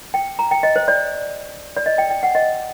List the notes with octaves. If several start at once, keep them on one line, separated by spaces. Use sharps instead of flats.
G5
A#5
G5
D#5
C5
D5
D5
D#5
G5
G5
F#5
D#5